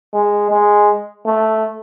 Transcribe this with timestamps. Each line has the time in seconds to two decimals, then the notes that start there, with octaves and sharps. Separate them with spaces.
0.13 G#3
0.51 G#3
1.26 A3